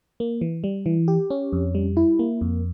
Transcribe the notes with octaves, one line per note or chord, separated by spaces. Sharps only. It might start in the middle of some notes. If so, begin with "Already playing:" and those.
A#3
E3
G3
E3
G4
C#4
F2
G3
E4
A#3
F2